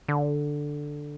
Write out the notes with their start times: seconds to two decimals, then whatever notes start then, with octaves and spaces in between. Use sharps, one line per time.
0.08 D3